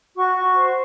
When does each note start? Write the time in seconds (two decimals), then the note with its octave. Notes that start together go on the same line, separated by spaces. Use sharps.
0.16 F#4 C#6
0.36 F#4
0.56 C5